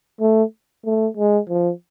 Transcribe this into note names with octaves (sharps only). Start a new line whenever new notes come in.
A3
A3
G#3
F3